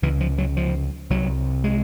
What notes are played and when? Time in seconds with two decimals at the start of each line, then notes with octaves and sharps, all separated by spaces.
0.02 C#2 C3 E3
0.20 F3
0.38 F#3
0.57 F3
1.10 C2 C3 F#3
1.64 G#3